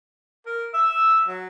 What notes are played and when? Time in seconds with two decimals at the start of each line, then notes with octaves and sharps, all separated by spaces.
0.46 A#4
0.74 E5 E6
1.28 F#3